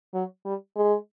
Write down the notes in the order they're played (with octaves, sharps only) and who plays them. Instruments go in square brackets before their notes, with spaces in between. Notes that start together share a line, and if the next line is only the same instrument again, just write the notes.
[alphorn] F#3
G3
G#3